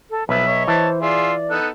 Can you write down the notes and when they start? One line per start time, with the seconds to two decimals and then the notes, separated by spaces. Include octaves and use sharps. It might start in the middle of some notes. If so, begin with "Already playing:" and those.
0.10 A4
0.29 B1 F3 B4 E5
0.47 C#5 D#5
0.68 E3 C5 A5
1.01 F4 G#4 D5 E5 C6
1.50 B3 D#4 A4 F#6